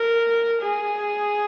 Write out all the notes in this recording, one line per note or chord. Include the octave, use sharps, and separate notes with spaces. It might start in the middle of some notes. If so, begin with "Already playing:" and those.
Already playing: A#4
G#4